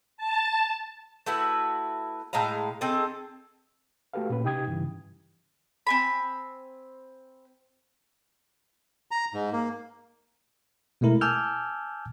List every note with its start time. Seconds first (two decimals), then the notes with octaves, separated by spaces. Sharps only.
0.17 A5
1.26 A3 E4 F#4 B4
2.33 A2 G#3 F5 A#5
2.81 C4 D#4 G#4 A4
4.14 A3 F#4 G4 A4 B4 F5
4.30 A#2 C#4 B4
4.44 C3 D#4 G4 G5 D#6 G#6
4.67 G2 C#3 E3
5.87 C4 G#5 B5
9.11 A#5
9.34 G#2
9.53 A#3
11.01 B2 G#3 A3 E4 A#4
11.21 G#5 A5 D6 E6 F6 G6